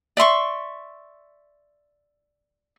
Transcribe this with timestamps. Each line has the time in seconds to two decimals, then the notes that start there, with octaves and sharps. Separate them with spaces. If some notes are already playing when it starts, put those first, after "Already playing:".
0.17 D5 E5 C6 C#6